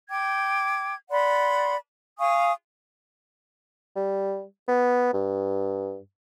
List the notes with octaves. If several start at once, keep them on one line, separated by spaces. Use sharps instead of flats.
G5 D6 G#6
D5 F#5 B5 C6
F5 G#5 C#6 D#6
G3
B3
G2